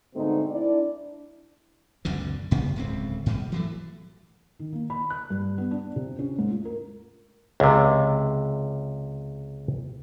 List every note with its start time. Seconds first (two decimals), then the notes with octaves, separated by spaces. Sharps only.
0.14 G#2 B2 D3 A3 C4 D#4
0.50 D4 E4 D5
2.05 C#2 F#2 B2 D3
2.51 C2 G2 C#3 B3
2.76 D1 C#2 C4
3.26 G#2 B2 G3
3.52 E3 F#3 A3
4.59 D#3
4.73 A#3
4.90 B5
5.10 F#6
5.30 G2
5.58 B3
5.71 D4
5.96 C3
6.19 C#4
6.39 G#2
6.51 F4
6.65 A#4
7.60 C#2 C3